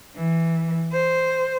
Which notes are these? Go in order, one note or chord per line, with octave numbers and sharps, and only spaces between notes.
E3
C5